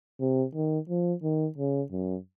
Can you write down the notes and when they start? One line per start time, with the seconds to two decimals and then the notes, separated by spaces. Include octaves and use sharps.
0.20 C3
0.55 D#3
0.89 F3
1.24 D#3
1.58 C#3
1.92 F#2